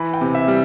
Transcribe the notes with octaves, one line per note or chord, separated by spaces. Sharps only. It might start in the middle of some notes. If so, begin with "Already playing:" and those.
Already playing: E3 B5
G5
C3
E5
G3